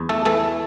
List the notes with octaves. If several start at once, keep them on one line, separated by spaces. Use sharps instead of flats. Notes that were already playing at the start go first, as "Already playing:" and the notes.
Already playing: E2
A3 A4
E3 A3 A4